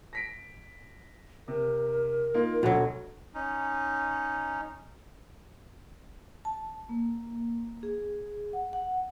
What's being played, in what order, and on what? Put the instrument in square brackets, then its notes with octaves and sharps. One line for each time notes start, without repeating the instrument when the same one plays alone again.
[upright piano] A#6 B6 D7
[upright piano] C3 [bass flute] A#4
[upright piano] A#3 D#4 F4
[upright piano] D2 D3 [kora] B2 F#3 [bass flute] A4
[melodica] C#4 D#4
[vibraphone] A5
A#3
G#4
F#5
F#5